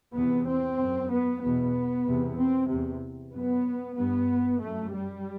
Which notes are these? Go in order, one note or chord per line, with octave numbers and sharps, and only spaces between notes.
E2 C3 B3
C4
F#2
B3
E2 B2 B3
E2 C3
C4
E2 C3
F#2 B3
G2 B3
F#2 A3
G3